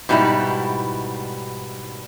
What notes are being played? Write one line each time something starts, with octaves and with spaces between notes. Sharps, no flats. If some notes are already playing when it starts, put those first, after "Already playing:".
G#2 B2 G3 D#4 E4